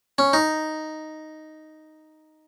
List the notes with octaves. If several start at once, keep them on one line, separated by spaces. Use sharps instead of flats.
C#4
D#4